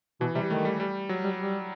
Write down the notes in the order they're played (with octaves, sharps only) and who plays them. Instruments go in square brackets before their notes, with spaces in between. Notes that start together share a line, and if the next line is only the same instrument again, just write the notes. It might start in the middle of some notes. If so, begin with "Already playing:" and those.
[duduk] B2 [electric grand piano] E3
[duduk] C3 [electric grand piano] G3
[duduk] D#3 [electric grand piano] A3
[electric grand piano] G3
G3
F#3
[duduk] G3
G3